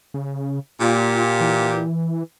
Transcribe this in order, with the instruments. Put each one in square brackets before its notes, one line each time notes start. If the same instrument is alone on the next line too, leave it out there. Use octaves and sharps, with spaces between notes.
[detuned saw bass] C#3
[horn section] A#2 G4 [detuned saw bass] F4
[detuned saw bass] E3